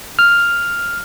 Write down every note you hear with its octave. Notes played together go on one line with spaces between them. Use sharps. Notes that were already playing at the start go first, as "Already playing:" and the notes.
F6